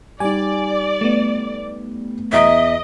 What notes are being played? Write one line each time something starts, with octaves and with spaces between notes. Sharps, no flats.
G3 D#4 D5 G#5
A3 B3
E2 D#5 E5 A#5 D7